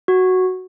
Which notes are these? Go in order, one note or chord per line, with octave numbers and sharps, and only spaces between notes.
F#4